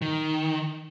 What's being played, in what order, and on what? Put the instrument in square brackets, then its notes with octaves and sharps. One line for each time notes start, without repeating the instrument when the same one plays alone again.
[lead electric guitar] D#3